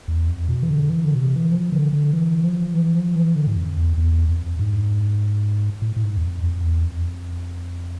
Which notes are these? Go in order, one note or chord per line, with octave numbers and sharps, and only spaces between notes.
E2
F2
B2
E3
D3
E3
D3
B2
C3
E3
F3
D3
D3
E3
F3
E3
F3
E3
D3
G#2
F2
E2
E2
F2
G#2
A2
A2
G#2
E2
F2
F2
E2
F2